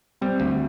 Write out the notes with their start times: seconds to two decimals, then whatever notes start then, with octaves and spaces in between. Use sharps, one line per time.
0.21 G3 C4
0.40 D2